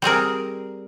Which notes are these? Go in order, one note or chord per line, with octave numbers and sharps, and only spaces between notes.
G3 C4 G#4 A#4